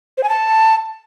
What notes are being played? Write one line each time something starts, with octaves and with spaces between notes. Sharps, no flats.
C5
G#5
A5